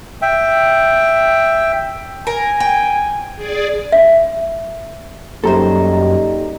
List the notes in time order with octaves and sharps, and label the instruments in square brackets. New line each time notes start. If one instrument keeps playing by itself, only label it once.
[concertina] E5 G5
[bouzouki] A#4 [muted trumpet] G#5
[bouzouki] G5
[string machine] G#4 D5
[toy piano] E5
[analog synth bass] F#2 [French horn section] G3 D#4 [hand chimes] A#3 G4 A#5 [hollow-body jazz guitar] A4 C5